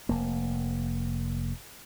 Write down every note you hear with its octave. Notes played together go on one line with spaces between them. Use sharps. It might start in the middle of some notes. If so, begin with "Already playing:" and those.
F1 A#3